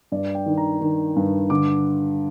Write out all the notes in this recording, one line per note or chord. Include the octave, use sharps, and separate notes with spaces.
G2 D5
G5
D#3
A#5
D#3
G2
D3 D6